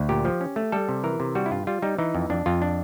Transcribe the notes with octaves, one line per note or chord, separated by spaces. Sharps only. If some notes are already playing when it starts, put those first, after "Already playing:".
Already playing: D2
A#2 G4
F3
C#4
A3
G3 A4
C3
E3 A#4
C3
G3 F#4
E4
G2 F4
G3 F4
G3 D#4
E3 D#4
F2
F2 D4
F2 F4
D4